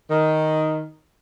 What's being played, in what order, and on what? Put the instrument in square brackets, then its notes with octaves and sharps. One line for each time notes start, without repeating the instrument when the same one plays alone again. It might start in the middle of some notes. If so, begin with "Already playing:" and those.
[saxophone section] D#3